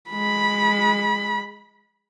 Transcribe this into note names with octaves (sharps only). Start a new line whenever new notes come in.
G#3 B5